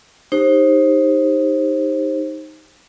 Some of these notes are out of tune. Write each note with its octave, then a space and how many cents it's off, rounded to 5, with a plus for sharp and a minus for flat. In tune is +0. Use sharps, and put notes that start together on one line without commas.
D#4 +0 G4 +25 C5 +25